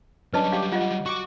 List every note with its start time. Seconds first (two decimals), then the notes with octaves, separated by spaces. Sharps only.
0.33 F#3 G3 C#4 D4 B4 D#5 A5
0.52 G4 F5
0.72 F4 D#5 F#5
1.06 F#4 F#5 C#6 D6